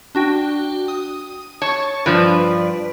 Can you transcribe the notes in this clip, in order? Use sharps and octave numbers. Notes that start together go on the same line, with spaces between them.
D4 F#4 G5
D#6
C#5 A5 C#6 C#7
G2 F3 B4 D5